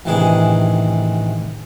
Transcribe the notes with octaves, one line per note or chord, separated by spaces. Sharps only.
A1 C3 D#3 E3 D4 G#4